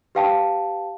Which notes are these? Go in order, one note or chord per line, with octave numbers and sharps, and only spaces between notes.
G4 B4 F5 G5 A5